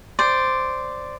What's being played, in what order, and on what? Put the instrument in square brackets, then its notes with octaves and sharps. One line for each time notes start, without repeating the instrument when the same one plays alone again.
[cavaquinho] C5 D5